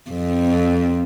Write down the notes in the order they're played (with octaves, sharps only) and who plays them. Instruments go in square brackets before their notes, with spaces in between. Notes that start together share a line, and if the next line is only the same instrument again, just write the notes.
[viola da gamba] F2